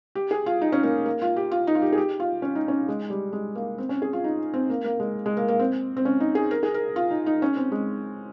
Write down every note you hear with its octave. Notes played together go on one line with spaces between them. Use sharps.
G4
G#4
F4
D#4
C#4
A#3
A#3
F4
G4
F4
D#4
F4
G4
G#4
G4
F4
C#4
D#4
C#4
G#3
G3
G#3
A#3
C4
C#4
G#4
F4
D#4
C4
A#3
A#3
G#3
G#3
A#3
A#3
C4
C4
C#4
D#4
G#4
A#4
G#4
A#4
F4
D#4
D#4
C#4
C4
G#3